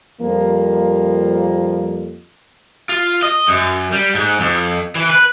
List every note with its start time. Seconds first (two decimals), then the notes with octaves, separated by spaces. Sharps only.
0.21 F2 F3 G3 A#3
2.89 F4
3.23 D#5
3.48 F#2
3.92 G3
4.15 G#2
4.40 F2
4.95 E3
5.10 B4